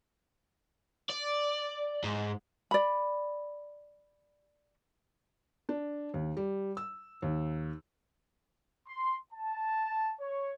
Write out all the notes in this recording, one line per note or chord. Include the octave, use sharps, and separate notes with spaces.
D5
G#2
D5 B5
D4
D#2
G3
E6
D#2
C6
A5
C#5